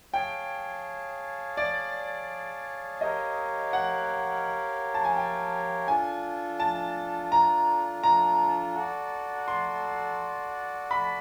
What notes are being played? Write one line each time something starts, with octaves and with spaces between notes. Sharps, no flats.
G#4 C#5 F5 G5 A5
D5
G4 A#4 C#5 D#5 F5
F#5
A5
G#5
G5
D4 F4 A4 G#5
A5
A#5
A#5
F#4 A4 D5
C6
B5